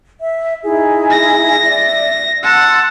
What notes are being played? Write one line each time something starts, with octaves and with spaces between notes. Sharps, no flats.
E5
D#4 E4 G#4
A#6
D5 E5
F#5 A5 C6 E6